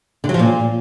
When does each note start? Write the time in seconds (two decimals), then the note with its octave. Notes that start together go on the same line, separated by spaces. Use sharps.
0.24 D3
0.29 F#3
0.34 F3
0.39 A#2